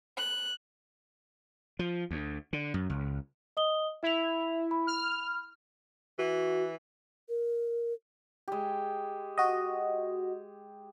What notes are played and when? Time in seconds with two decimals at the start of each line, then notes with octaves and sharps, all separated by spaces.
0.17 F#6
1.79 F3
2.11 D2
2.53 D3
2.74 F#2
2.90 C#2
3.57 D#5 D#6 G7
4.03 E4 E5 F7
4.71 B5
4.87 F6
6.18 E3 F#4
7.29 A#4
8.48 G#3 G4
9.38 F#4 D#5